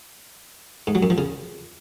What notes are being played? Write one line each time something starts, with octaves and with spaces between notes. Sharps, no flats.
G#2
F#3
F#2
F3
C#3